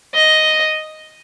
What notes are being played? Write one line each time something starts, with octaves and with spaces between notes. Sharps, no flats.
D#5